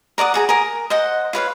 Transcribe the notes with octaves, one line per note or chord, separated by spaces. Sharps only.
A#4 D5 F#5 D#6
F#4 G#4 A#5
A#4 G#5 D#6
C5 D#5 F#5
F4 B4 C#5 F5